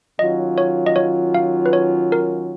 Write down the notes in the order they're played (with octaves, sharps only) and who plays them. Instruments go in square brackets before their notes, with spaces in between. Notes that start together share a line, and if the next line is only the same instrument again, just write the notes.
[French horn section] D#3 F#3 C#4 F4 [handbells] D#5
[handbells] C#5
D#5
C#5
F5
B4
C#5
A#4